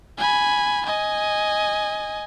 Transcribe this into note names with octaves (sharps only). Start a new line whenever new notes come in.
G#5 B5
D#5 G#5